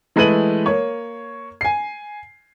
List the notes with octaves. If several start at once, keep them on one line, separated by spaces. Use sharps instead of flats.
E3 G#3 A3 B4 D#7 F#7
A#3 C#5
G#5 C7